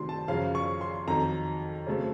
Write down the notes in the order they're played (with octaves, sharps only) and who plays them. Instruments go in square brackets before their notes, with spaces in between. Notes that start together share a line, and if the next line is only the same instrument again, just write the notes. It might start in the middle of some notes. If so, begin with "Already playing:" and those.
Already playing: [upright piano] C3 D#3 F#3 A3 C6
A5
F#2 C#3 F3 F5
C#6
C6
F2 D#3 F#3 A#5
C#3 F#3 A3 C4